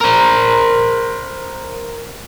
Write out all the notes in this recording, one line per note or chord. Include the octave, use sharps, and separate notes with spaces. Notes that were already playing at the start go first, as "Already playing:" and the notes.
A#4 C5